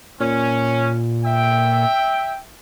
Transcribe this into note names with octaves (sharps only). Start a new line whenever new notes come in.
A#2 C#4
E5 G5